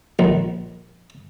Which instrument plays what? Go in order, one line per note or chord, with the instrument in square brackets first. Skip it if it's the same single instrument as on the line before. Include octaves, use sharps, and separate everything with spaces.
[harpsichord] A#1